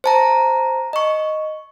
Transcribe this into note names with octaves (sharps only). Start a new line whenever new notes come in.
C5 A5 A#5
D#5 C#6